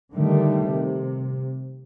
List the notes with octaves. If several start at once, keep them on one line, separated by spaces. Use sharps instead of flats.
D3 D#3 G3 A3
C3